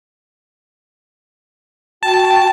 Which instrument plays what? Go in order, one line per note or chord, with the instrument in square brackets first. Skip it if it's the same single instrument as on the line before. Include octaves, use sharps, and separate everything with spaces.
[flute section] F#4 G5 [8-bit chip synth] A5